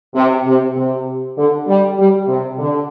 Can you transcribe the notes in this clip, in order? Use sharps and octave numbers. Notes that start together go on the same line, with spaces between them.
C3
C3
C3
D3
G3
G3
C3
D3